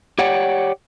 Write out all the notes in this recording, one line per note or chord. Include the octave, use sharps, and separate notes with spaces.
G4 C#5 D5 F#5 G5